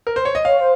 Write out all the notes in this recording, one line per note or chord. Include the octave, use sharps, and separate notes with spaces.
A#4
C5
C#5
D#5
C#5 F5
C5